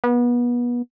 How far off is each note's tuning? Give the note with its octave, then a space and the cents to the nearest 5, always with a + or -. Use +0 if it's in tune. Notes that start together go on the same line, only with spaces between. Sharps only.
B3 -30